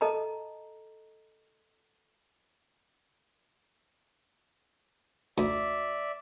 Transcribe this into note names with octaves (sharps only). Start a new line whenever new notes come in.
A4 D#5 A5 A#5
D2 D5 E5